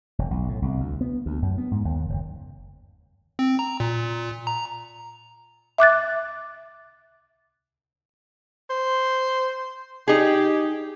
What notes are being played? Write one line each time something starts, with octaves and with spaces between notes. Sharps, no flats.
E1
B1
A2
C2
D2
B3
D2
F#2
B3
G#2
D#2
F#1
C4
A#5
A#2
A#5
E5 D6 F#6 A6
C5
D#4 G4 G#4